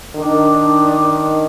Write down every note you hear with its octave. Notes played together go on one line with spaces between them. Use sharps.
D#3 D4